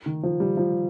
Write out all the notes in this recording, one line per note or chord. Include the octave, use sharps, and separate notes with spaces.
D#3
F3
G3
F3